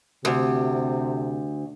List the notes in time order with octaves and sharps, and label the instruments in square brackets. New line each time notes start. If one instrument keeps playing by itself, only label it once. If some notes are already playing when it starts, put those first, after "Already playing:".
[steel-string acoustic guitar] D2 [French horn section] C3